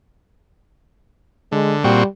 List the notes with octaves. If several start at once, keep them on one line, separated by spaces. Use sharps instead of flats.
D3 G#3
A#2 G3 C4 F#4